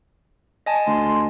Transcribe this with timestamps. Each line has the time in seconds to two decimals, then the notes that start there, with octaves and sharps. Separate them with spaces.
0.66 D#5 G#5 A5
0.87 D2 C6